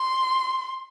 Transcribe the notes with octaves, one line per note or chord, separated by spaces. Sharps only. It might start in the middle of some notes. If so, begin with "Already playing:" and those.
Already playing: C6